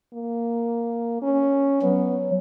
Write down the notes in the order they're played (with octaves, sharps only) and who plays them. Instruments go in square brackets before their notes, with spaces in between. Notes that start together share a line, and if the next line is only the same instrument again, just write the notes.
[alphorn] A#3
C#4
[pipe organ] F#3 [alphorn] B3